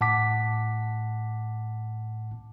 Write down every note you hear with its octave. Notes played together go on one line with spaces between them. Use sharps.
A2 F#5 A5 D6 B6